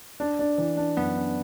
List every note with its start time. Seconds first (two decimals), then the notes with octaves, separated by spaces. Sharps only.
0.20 D4
0.39 D4
0.58 E3
0.77 D4
0.97 F#2 B3 B4
1.16 D4